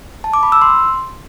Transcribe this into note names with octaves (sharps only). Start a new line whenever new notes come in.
A5
D6
B5
E6
C6